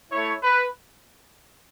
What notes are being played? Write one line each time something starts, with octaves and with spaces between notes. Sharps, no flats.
A3 E4 C#5
B4